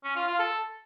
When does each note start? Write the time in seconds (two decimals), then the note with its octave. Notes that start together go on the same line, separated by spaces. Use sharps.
0.04 C#4
0.16 F4
0.28 F4
0.39 A4